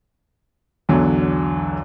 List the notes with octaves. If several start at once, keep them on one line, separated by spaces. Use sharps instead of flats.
B1 E2 D3 F#3